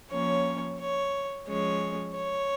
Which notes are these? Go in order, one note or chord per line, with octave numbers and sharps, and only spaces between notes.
F3 A#3 C#4 C#5
C#5
F3 G#3 C#4 C#5
C#5